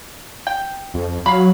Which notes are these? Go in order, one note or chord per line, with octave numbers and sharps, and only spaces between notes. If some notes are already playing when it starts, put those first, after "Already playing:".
G5
F2
F#3 F5 B5